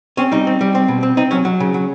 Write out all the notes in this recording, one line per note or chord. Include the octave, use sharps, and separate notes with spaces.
C4 C#4
G3 D#4
C4
G3
C4
B2
C4
C4 D#4
F#3 C#4
F#3
C#3
F#3